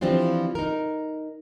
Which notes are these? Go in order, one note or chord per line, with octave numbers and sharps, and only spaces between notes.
E3 F3 G3 C4 D4 F4
D#4 A#4